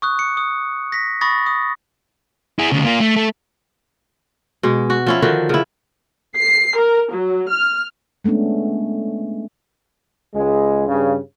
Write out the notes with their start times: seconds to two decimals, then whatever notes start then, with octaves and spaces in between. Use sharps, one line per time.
0.02 C#6 D#6 F#6
0.19 C#7
0.37 D#6
0.92 A#6 B6
1.21 B5 C#6 D#6 A6 A#6
1.46 D#6
2.59 E4 G#4
2.72 D2 C#3
2.85 A#3 F4
3.00 A3
3.16 A3
4.63 B2 G#3
4.90 F#4
5.07 F3 C#4 E4
5.22 D3 D#3 F3 F#4
5.49 C#3 E4
6.36 C7
6.77 A#4
7.11 F#3
7.49 F6
8.24 G#3 A3 B3 C#4 D4
10.34 C#2 G#3
10.87 G2 C#3